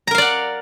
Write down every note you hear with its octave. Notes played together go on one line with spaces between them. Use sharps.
A#4 D5 F5 F#5 A#5